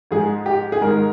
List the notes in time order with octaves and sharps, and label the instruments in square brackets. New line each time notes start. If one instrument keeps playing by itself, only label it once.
[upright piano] G#2 F3 G#3 G#4
G4
G#4
G#2 D#3 G#3 A#4